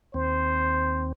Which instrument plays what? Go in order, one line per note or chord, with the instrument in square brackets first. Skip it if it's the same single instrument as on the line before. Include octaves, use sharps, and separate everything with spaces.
[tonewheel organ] D#2 C4 [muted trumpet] C5